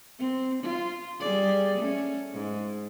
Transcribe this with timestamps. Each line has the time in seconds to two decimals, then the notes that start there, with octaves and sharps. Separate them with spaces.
0.19 C4
0.63 F4
1.20 G3 G#4 D5
1.78 A3 C#4
2.33 G#2